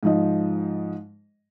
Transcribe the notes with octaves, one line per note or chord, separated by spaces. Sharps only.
G#2 F3 D#5